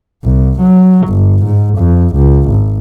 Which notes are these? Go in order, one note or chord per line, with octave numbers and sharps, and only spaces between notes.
C2
F#3
G1
G#2
F2
C#2
G#1